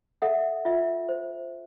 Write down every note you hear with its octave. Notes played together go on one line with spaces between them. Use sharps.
A4 E5 F#5
F4 E5
C5